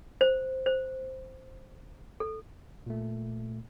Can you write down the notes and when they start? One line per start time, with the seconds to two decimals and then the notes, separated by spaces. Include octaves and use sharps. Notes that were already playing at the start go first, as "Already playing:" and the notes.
0.21 C5
0.66 C5
2.20 A4
2.86 A#2 A3